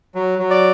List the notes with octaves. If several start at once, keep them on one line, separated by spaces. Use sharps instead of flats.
F#3
F#3
D5